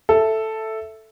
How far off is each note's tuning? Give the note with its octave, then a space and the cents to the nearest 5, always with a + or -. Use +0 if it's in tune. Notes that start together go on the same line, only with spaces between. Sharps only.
A4 +0 E5 +0